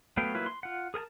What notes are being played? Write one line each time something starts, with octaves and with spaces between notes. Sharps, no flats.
F#3 A3 B3 F5 G5
F#3 A#3 E4 F4 B4
C6
F4 F#5
G#4 A#4 G#5 A5